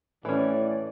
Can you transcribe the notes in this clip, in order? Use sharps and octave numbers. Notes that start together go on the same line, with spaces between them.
A2 E3 C#4 A4 C#5 D5 E5